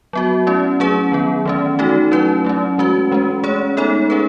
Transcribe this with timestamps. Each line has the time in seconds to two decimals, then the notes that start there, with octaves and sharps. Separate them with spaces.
0.13 F#3 B3 F#4
0.47 A3 C#4 E4
0.80 F#3 C#4 G#4 B4
1.12 D#3 F#3 B3
1.45 E3 A3 C#4
1.79 E3 A3 D#4 F#4 A4
2.11 F#3 C#4 E4 B4
2.45 F#3 A3 C#4
2.78 E3 G#3 C#4 F#4 B4
3.11 E3 G#3 C#4
3.44 A3 C#4 G#4 C#5
3.77 G#3 B3 D#4 A4 C#5
4.10 C#4 G#4 B4